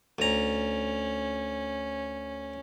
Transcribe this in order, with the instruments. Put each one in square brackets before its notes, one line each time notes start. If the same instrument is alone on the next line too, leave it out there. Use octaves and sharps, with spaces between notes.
[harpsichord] D2 A#5 [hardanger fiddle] C#4